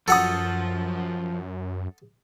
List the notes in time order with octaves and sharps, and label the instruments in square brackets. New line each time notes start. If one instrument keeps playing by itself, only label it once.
[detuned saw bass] F#2 [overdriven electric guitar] F3 [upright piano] F#4 D#6 [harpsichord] A4 F#5